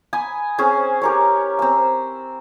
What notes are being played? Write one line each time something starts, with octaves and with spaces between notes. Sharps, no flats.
G#5 B5 D#6
C4 C#4 G#4
G4 A#4 C#5
C4 E6